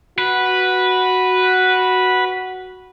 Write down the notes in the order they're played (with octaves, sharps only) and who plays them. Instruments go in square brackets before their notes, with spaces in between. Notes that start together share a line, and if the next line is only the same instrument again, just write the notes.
[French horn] F#4 [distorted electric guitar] B4